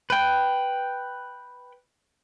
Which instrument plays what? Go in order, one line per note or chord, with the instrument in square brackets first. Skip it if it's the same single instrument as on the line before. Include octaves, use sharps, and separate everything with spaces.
[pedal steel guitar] B4 G5